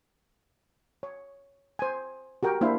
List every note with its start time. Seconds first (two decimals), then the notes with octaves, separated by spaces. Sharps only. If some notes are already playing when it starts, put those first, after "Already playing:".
1.03 C#5
1.79 C5 G#5
2.43 F#4 G4 A#4 G5
2.61 A#3 D4 E4 C5 F5